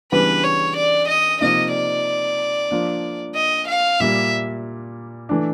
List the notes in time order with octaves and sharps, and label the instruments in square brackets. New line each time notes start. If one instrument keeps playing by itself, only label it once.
[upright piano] C#3 E3 G3 B3 D4 [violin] B4
[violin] C#5
D5
D#5
[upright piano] C3 F3 A#3 D#4 [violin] D#5
[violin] D5
[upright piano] F3 A#3 D4
[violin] D#5
F5
[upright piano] A#2 G3 A#3 [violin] E5
[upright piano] E3 A3 D4